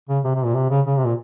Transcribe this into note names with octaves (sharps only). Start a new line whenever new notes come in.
C#3
C3
C3
A#2
C3
C#3
C#3
C3
A#2